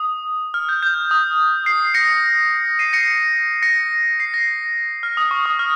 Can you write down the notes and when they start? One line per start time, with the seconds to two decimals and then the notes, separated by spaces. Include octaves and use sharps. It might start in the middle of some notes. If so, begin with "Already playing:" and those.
Already playing: D#6
0.54 F6
0.69 G6
0.83 G6
1.11 D#6
1.66 C7
1.94 A#6 C#7
2.79 C7 D#7
2.93 A#6 C#7
3.63 A#6 C#7
4.20 C7
4.34 A#6
5.03 F6
5.17 D#6
5.31 C#6
5.46 D#6
5.59 F6